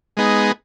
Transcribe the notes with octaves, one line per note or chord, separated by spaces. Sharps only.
G#3 B3 D#4 G#4